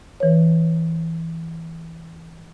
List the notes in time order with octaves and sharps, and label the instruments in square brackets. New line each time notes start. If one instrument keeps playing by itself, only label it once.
[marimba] E3 B4 C#5